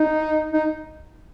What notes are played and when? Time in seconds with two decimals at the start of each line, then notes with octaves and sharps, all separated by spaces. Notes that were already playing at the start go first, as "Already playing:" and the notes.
Already playing: D#4
0.53 D#4